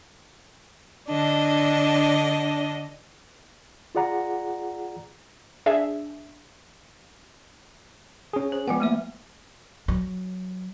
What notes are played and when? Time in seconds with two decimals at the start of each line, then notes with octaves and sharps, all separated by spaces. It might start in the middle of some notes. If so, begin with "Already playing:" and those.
1.09 D3 D4 D#5
3.95 F4 G#4 D5 F#5 A#5
5.66 D4 G#4 E5
8.33 C#4 G#4
8.52 C5
8.68 F3 G#3 B3 G5 G#5
8.80 A3 A#3 E5
9.88 F#3